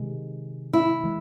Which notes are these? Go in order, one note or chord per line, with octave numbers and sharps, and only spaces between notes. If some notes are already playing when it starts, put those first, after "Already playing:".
Already playing: C3 D#3 G#3
E4
E3 G#3